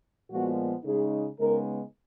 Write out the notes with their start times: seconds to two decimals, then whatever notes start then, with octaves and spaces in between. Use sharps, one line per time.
0.31 A#2 F3 G#3 B3 F#4
0.85 C#3 G#3 D#4 G#4
1.38 C#3 G#3 B3 D#4 A#4